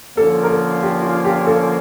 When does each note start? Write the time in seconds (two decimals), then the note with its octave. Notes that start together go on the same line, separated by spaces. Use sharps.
0.17 D3 F3 A#3 C#4 A4
0.43 A#4
0.50 A4
0.82 G4
1.03 F4
1.25 G4
1.47 A4